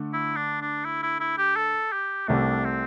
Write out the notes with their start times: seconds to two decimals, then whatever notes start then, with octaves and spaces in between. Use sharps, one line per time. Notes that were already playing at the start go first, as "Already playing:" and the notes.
Already playing: D3 A3
0.13 E4
0.36 D4
0.61 D4
0.85 E4
1.03 E4
1.20 E4
1.38 G4
1.56 A4
1.92 G4
2.28 C2 C3 A3 D4
2.65 C4